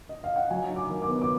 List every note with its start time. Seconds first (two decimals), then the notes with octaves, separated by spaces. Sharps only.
0.09 D#5
0.24 F5
0.36 F#5
0.51 F#3 G#5
0.70 D#4
0.76 D6
0.89 D#3
1.02 D6
1.09 B3
1.22 D6